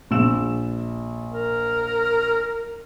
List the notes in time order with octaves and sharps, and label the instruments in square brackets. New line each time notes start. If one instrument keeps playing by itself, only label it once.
[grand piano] A#1 E6 E7
[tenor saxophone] A#4